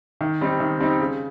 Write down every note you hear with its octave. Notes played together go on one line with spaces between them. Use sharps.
D#3
G3 C4 D#4
D#3
G3 C4 D#4
C#3